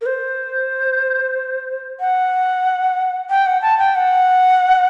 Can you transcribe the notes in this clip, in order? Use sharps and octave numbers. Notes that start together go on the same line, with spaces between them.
A#4
C5
F#5
G5
F#5
A5
G5
F#5